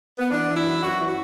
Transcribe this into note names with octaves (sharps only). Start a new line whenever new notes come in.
B3
E3 D4
E3
E4
F#2
F#2 F#4
E3
F#4